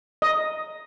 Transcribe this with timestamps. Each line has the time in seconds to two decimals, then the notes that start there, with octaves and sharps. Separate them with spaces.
0.22 D#5